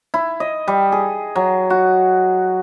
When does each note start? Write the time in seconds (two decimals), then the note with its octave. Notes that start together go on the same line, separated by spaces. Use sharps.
0.14 E4
0.40 D#5
0.68 G3
0.92 G#4
1.36 F#3
1.70 F#4